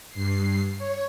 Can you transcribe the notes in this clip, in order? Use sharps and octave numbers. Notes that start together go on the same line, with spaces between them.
G2 C7
C#5